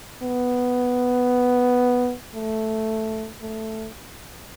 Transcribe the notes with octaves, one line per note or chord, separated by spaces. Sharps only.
B3
A3
A3